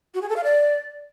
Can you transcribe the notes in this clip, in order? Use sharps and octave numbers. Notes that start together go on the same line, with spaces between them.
F#4
G#4
A4
F5
D5